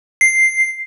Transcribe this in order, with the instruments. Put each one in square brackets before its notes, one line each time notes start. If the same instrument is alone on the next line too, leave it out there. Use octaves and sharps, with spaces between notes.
[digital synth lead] C7